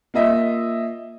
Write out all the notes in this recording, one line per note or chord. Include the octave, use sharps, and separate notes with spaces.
A#3 F4 D#5 E5